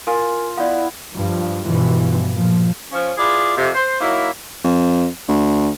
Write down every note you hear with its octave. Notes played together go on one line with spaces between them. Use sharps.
F4 A#4 G#5
B3 E4 D5 F5
G2 F3
G2 B2 E3 F3
A#2 F3
F3 C#4
E4 F4 G#4 B4 D5
F2 C3
C5
F#3 A#3 D#4 E4
F2
D2